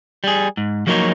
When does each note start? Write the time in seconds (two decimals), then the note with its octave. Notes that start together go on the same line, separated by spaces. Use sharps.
0.24 G3 G#4
0.57 G#2
0.87 F3 F#3 A#3 D#4 A#4 C#5